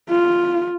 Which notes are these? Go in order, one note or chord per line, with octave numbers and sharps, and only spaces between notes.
F4